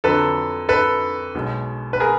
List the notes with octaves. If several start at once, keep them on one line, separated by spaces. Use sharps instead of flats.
F2 D3 F#3 A4 B4
A4 B4
B1 B2 G#3
B4
G#4 A#4